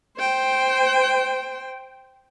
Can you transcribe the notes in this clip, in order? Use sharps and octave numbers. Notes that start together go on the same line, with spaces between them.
C5 G5